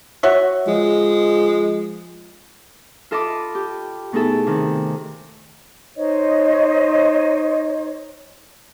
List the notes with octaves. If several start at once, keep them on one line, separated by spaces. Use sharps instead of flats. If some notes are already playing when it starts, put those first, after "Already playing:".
F#4 C#5 E5
F3 G#3
F4 A4 D#5 A5 B5 D6
G4
B2 A3 D#4 E4 G#4 A4
C3 D#3
D#4 C5 C#5 D#5